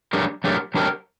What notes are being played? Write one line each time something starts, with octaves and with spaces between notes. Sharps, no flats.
F#3 A3 D4 G4 A#4
F#3 A3 D4 G4 A#4
F#3 A3 D4 G4 A#4